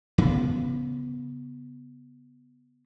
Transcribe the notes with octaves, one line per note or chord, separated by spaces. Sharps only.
C#3 B3